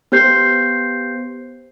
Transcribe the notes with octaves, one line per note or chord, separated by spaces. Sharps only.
B3 G4 C5 G6 C7